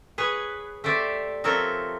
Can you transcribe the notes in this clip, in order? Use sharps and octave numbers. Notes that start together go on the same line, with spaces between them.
G#4 B4 C#5
A3 G4 C5 D5 E5
F3 C4 A4 A#4 C#5 E5